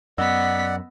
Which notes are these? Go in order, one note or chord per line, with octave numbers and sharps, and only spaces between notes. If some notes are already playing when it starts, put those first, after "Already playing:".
F#2 B3 D5 D#5 F#5 E6 B6